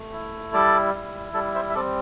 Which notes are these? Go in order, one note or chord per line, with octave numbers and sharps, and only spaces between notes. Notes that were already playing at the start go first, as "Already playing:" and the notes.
Already playing: A3
E4
G3 A4 D5
E4
G3 A4
C5 E5
E5
C4 A4 D5